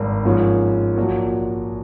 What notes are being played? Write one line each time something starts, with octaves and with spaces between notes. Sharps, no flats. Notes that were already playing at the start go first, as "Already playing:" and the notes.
Already playing: G#1 G2 D#3
G#2 F3 A#3 C#4
A#1 A#2 F#3 A#3